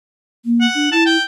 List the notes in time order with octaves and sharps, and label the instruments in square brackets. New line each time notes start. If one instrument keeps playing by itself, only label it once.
[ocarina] A#3
[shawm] F#5
[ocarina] D4
[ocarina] E4 [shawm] A5
[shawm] G5